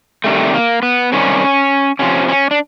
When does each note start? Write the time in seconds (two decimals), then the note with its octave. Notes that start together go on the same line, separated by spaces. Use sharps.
0.24 C3 D#3 G3 A3
0.54 A#3
0.83 B3
1.12 C3 D#3 G3 C#4
1.99 C3 F3 C#4
2.28 C#4
2.51 D4